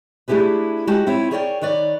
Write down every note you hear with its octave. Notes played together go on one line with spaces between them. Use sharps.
A3 D4 E4 G4 G#4 B4
G#3 F#4 G4 A5
C4 E4 F4 C#5
G#4 A#4 C#5 D5 F#5 G5
D#3 B4 C#5 D5